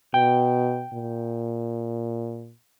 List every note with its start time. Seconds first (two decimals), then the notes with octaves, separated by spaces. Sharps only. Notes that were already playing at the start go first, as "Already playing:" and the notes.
0.14 B2 G5
0.93 A#2